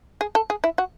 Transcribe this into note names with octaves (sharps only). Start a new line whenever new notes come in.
G#4
A4
G#4
E4
F#4